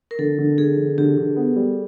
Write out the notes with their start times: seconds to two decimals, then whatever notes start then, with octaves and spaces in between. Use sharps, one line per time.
0.11 A#4
0.19 D3 A4
0.38 D3
0.58 D3 G#4
0.77 D3
0.98 D3 G4
1.17 D3
1.36 B3
1.56 G3